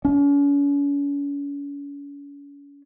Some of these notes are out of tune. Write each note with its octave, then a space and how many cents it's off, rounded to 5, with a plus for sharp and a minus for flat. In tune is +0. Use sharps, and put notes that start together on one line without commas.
C#4 +40